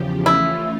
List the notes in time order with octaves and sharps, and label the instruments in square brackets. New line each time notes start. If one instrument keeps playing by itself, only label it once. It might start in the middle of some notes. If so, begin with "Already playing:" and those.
Already playing: [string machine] E2 C#3 F3 G4
[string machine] E3 A3 C#4 F4 [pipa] E4